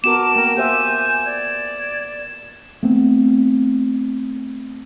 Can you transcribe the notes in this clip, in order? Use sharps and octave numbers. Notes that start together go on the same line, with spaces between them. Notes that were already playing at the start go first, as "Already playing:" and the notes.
B3 F#4 A#4 A5 D6 E7
A#3 A#4 G5
G4 C5 E5 G#5 D6 G6
D5 G#6
A3 B3 C4